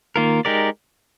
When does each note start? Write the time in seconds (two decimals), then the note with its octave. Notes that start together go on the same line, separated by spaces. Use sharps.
0.16 D#3 A#3 F4 A#4
0.45 G#3 D#4 G4 A#4 D5